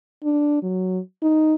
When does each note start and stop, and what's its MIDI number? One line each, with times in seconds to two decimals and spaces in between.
0.24 0.61 62
0.63 0.99 54
1.22 1.55 63